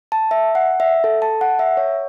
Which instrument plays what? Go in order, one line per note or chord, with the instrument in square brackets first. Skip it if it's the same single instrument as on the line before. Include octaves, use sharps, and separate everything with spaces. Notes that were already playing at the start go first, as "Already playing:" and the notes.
[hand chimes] A5
E5
F#5
E5
A4
A5
F#5
E5
C#5